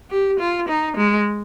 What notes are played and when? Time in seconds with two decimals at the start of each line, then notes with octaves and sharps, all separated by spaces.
0.10 G4
0.39 F4
0.68 D#4
0.97 G#3